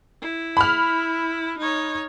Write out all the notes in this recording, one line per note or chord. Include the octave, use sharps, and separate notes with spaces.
E4
B5 F6
D#4 C#5